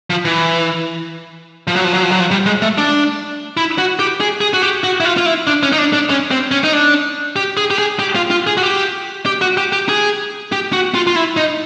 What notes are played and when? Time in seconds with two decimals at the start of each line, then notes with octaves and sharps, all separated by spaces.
0.10 F3
0.25 E3
1.67 F3
1.76 F#3
1.84 F3
1.94 F#3
2.03 F3
2.11 F#3
2.20 F3
2.31 G3
2.46 G#3
2.62 A3
2.78 D4
3.57 E4
3.78 F#4
3.99 G4
4.20 G#4
4.41 G#4
4.54 F#4
4.62 G4
4.84 F#4
5.00 E4
5.05 F4
5.17 F4
5.26 E4
5.47 D4
5.63 C#4
5.72 D#4
5.78 D4
5.93 D4
6.10 C#4
6.31 C4
6.51 C#4
6.64 D#4
6.73 D4
7.36 G4
7.57 G#4
7.71 G4
7.78 G#4
7.99 G4
8.16 F4
8.31 F4
8.47 G#4
8.57 F#4
8.63 G4
9.26 G4
9.41 F#4
9.57 G4
9.72 G4
9.89 G#4
10.52 G4
10.73 F#4
10.95 F4
11.07 F4
11.16 E4
11.37 D#4